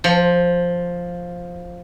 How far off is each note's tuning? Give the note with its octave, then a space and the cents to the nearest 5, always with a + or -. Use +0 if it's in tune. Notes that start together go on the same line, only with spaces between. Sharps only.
F3 +5